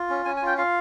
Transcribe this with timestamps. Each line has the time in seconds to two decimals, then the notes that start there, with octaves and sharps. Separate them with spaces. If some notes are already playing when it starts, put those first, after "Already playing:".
Already playing: F4
0.09 C#4
0.25 C#4 G#5
0.36 G#5
0.42 F4 G5
0.58 F4 F5